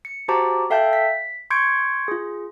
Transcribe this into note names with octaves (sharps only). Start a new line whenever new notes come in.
C#7
F#4 G4 C5 A5 A#5 D6
A4 E5 F5 G5 A5 G6
B6
C6 C#6 G6 G#6 C#7 D7
F4 G#4